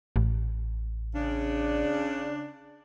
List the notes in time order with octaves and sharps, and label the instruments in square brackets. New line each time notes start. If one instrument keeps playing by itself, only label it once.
[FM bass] A1
[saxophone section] C#3 D4